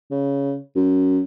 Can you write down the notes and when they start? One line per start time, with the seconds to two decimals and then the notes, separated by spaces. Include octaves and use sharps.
0.11 C#3
0.76 F#2